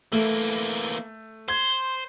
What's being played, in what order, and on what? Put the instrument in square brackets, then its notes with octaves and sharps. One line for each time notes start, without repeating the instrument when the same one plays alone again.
[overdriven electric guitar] E3 A#3 [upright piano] A3
[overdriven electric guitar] C5 [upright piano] G#6